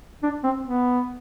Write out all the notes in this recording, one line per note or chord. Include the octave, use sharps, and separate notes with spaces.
D4
C4
B3